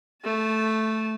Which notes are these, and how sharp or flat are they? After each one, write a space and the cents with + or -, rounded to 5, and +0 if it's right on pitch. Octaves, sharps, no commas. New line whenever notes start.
A3 +0 A5 -20